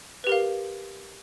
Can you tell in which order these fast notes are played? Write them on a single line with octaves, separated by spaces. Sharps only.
B4 G4 A#4 F5